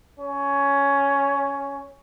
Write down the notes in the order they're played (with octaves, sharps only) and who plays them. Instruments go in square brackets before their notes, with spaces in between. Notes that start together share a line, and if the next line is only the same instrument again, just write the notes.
[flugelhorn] C#4